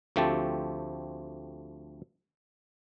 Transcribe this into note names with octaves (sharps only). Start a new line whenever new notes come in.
D2 F3 A3 C4 G4 A5